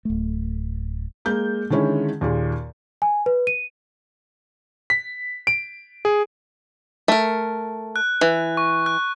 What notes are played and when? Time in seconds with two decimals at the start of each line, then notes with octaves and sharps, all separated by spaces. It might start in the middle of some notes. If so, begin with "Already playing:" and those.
0.05 D1 A3
1.25 G#3 A#3 G6
1.70 D3 D#3 G#3 C#4 E4
2.21 D#2 A#2 G#4
3.02 G#5
3.26 B4
3.47 D#7
4.90 B6
5.47 D7
6.05 G#4
7.08 A3 A#4
7.96 F#6
8.21 E3
8.57 C#6
8.86 F#6